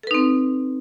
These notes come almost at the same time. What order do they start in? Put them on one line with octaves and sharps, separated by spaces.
A4 B4 D#4 C4